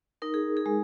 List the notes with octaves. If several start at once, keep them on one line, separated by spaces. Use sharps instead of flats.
D#4 A#4
G#4
G#4
G#3